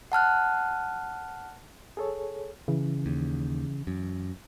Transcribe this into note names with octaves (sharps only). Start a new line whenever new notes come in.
F#5 A5 F6 F#6
G#4 A4 C#5
C#3 E3
D#2
F#2